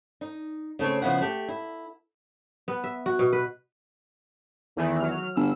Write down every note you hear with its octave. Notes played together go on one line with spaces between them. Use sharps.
D#4
C#3 A3 C4 C#5
C#3 F3 B3 E4 F#5
A3 G4
E4
B3
E5
F#4
B2
B4
E2 D#3 E3 A3
F#3 F6
G1 E6